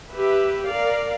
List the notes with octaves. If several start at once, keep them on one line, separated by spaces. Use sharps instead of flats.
G4 B4 E5
A#4 D5 F5